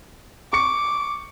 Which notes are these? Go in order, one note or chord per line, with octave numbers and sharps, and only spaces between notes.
C#6 D6 C#7